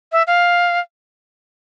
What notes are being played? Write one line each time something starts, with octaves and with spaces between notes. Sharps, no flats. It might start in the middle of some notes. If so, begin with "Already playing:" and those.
E5
F5